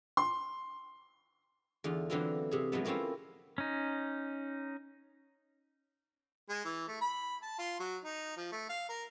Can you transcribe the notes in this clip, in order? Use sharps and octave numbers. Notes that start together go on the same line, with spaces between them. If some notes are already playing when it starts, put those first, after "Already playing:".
C6
E2 D3 F4
D3 E3 F#3 C4 E4 F4
C3 G#4
F3 F#3 G#3 A3 B3
A3 A#3 C4 C#4 E4 F4
C#4 D#4
G#3
E3
A3
B5
A5
F4
F#3
D#4
F3
A3
F5
A#4